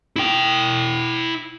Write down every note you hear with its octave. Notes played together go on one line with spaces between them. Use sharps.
E4 G5